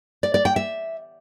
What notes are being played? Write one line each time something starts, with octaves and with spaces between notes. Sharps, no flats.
D5
D5
G5
E5